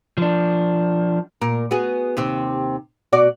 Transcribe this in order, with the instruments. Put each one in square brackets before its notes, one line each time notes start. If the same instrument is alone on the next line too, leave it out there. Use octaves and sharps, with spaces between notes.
[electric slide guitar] F3 D4
[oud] A#2 A#4
B3 F#4 G#4
D#2 C3 C4
B2 F#4 D5